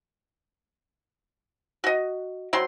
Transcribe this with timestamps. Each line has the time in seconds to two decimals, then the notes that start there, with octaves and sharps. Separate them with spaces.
1.84 F#4 D#5
2.53 F#3 C4 C6